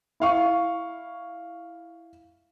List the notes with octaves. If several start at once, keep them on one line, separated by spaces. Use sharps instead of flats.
E4 F5 C#6